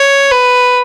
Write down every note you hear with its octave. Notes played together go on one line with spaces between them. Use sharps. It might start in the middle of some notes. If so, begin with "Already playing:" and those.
Already playing: C#5
B4